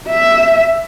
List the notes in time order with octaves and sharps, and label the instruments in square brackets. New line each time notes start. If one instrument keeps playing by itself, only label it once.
[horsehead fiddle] E5